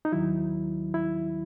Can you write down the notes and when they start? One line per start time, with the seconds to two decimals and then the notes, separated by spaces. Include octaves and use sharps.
0.05 D#4
0.12 D#2 D#3 F#3 E4
0.94 E4